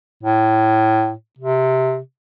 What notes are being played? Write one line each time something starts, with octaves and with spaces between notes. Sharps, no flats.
A2
C3